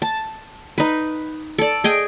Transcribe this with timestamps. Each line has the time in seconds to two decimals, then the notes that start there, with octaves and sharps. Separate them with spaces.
0.02 A5
0.78 D#4 B4
1.58 A4 D5
1.84 G#4 D#5 G5